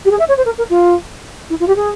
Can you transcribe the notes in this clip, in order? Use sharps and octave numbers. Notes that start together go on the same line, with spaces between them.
G4
G#4
E5
C#5
C5
A#4
A#4
F4
E4
F4
G4
G#4